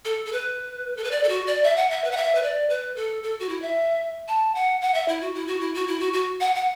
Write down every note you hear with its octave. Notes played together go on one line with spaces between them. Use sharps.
A4
A4
B4
A4
B4
D5
A4
F#4
D5
E5
F#5
E5
B4
F#5
E5
B4
D5
B4
A4
A4
F#4
E4
E5
A5
F#5
F#5
E5
E4
F#4
E4
F#4
E4
F#4
E4
F#4
F#4
F#5
F#5